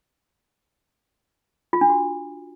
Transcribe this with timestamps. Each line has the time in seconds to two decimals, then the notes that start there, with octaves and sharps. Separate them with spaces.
1.73 F4
1.81 D4
1.89 F#4